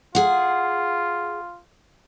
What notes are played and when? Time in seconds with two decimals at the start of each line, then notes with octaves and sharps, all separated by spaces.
0.15 F4 G#4 F#5